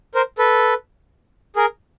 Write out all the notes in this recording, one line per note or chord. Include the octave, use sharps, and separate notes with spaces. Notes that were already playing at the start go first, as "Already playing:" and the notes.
A#4 C5
A4 B4
G#4 A#4